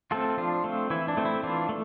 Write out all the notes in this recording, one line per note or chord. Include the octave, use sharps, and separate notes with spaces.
A3 C4 F4 A4
F3 D4 F4
A3 C4
E3 E4
D4
A3 C4
E4
E3 D4 F4
A3